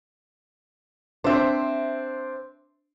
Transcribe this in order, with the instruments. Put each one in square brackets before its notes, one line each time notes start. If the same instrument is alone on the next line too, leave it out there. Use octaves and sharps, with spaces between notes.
[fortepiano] C4 D4 [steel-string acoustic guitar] C5 E5